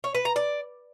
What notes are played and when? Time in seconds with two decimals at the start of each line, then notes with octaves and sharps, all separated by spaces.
0.04 C#5
0.15 B4
0.25 A#5
0.36 D5